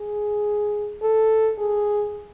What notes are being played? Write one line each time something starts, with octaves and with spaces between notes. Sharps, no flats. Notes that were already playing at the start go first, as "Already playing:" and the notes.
Already playing: G#4
A4
G#4